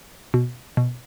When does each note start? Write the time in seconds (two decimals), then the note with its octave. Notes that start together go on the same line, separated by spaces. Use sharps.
0.34 B2
0.77 B2